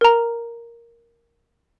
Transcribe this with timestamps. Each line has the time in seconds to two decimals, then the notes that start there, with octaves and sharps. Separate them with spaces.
0.01 A#4 A#5